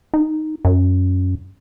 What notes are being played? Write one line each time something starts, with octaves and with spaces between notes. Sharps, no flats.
D#4
F#2